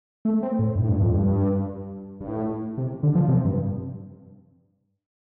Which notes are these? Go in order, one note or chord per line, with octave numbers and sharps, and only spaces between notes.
A3
C4
A2
G2
A2
G2
F2
G2
G2
A2
C3
D3
F3
C3
G2